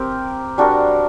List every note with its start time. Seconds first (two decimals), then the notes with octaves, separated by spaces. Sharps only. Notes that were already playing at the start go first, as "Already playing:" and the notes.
Already playing: C4 G4 A#4
0.58 G3 D4 F#4 A#4